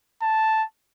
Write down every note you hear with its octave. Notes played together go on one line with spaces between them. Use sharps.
A5